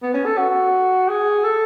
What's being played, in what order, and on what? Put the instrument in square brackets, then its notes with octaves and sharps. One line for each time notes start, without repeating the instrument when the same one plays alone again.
[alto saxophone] B3
C#4
A4
F#4
G#4
A4